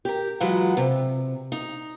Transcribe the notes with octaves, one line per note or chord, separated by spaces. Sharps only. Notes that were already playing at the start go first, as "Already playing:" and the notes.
G4 A#4
E3 F#3 G#3 F4 B4 F#5
C3
D#4